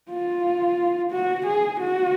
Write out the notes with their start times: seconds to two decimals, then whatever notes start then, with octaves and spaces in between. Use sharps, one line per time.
0.10 F4
1.12 F#4
1.46 G#4
1.80 F#4